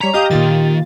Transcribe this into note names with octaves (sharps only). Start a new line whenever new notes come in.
G3 C#5 A#5 B6
G4 D#5 F5 D#6 G6
A#2 D#3 F4 A6